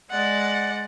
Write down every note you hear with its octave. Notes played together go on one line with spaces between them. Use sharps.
G#3 D5 F#5